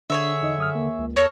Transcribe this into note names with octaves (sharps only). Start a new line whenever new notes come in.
D3 D4 G#4 C#5 E5
E2 D#4 D#5
F#2 D#6 F6
D#2 A#3
C#2
E2 A4 A#4 C#5 C#6